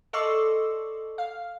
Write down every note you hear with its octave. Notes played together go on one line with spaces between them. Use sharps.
A4 D5 D#5 C6 C#6 E6
F5